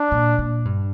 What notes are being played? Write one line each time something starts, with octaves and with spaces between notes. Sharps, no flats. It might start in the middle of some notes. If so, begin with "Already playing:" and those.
Already playing: D4
A#2
A#2
G2